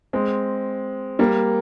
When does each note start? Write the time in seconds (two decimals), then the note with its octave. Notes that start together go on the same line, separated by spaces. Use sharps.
0.13 G#3 C4
1.19 G3 A#3